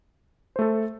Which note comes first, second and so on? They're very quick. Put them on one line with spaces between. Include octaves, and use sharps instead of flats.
C5 A3 A4